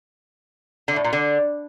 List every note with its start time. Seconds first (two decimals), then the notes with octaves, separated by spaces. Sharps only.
0.88 D3
0.96 A2
1.04 A#2
1.13 D3